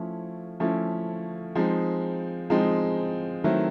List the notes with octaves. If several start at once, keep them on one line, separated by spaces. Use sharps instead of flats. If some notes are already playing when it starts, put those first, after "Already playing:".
Already playing: F3 A3 C#4 E4
F3 A3 C#4 E4
F3 G#3 C4 D#4
F3 G#3 C4 D#4
D#3 F#3 A3 C4 E4